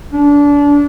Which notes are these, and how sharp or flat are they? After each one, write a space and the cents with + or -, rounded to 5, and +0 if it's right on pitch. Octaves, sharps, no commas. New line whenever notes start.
D4 -25